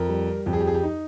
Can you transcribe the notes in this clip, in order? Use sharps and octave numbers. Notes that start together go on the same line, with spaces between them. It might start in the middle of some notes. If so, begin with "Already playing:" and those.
Already playing: F2 A#4
G3
F2 G4
G#4
G4
G#4
G4
D#4